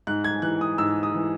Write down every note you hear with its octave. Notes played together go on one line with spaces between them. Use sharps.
G#2 F#6
G#6
E3 F#6
D#6
G#2 E6
D#6
E3